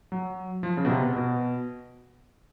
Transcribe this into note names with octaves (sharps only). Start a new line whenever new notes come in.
F#3
F3
C#3
B2
C3
B2
B2